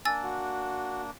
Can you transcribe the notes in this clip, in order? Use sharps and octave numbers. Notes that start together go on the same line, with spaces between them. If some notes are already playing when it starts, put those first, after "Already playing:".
A#3 D4 G#5 E6 A6
F#4